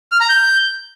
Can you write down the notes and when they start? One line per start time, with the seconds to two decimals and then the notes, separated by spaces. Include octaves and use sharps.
0.12 F6
0.20 A#5
0.29 G6